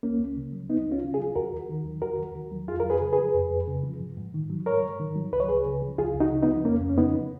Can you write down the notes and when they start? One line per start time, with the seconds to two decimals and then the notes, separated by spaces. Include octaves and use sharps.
0.03 C#2 A#3 C#4
0.20 C#2
0.37 C#3
0.53 F#3
0.69 C#2 B3 D#4
0.87 C#2 C#4 F4
1.03 C#3
1.14 F4 G#4
1.19 F#3
1.36 D#2 F#4 A#4
1.52 D#2
1.69 D#3
1.85 F#3
2.02 D#2 F#4 A#4
2.19 D#2
2.35 D#3
2.52 F#3
2.68 F2 F4 G#4
2.80 F2 A#4
2.90 G#4 B4
3.01 C#3
3.13 G#4 B4
3.18 F3
3.34 F2
3.51 F2
3.68 C#3
3.84 F3
4.00 G#2
4.17 G#2
4.34 D#3
4.50 F#3
4.66 G#2 A#4 C#5
4.83 G#2
5.00 D#3
5.16 F#3
5.33 C#2 B4
5.40 C#5
5.48 C#2 G#4 B4
5.66 C#3
5.82 F3
5.98 C#2 F4 G#4
6.15 C#2
6.20 D#4 F#4
6.32 C#3
6.43 B3 D#4
6.48 F3
6.65 F2 A#3 C#4
6.81 F2
6.89 C#4
6.98 C#3 B3 D#4
7.14 F3